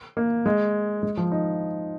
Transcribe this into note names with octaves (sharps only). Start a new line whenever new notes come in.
A#3
G#3
G#3
F3
D#4